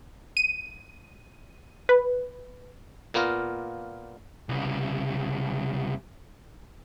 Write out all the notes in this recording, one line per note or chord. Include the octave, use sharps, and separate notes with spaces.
D#7
B4
A#2 A#3 B3 F4 A#4
C2 C#3